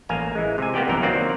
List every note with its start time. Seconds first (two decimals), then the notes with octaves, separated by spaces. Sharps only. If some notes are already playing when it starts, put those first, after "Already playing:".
0.09 A1 A#3 F5 G#5 A#5
0.35 E3 G#3
0.58 C3 G#5
0.74 A#3 B3 G4 D5 G5
0.88 B1 F#2 C3 E3 A#4 G5
1.03 D#3 F#3 A#3 C4 F4 D5